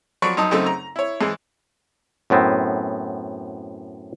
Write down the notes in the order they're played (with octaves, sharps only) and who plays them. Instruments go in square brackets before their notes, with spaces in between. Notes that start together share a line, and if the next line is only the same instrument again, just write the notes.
[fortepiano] F3 F#3 D5 B5 C#6
F#2 D#4 A5 D#6
F#2 C#3 A3 C4 D#4
A#5
E4 C#5
G#2 E3 G#3
[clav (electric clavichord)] F#2 A2 B3 C4